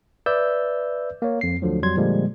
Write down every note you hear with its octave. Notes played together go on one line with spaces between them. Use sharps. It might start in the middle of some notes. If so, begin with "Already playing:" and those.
B4 D5 E5 E6 G6
A#3 C#5
F2 C7
D2 D3 F3 F#3
F2 F#3 G3 C6 G#6
A#2 D3 F3 G3 G#3 A#3